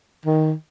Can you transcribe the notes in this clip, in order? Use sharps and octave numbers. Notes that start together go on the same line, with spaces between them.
D#3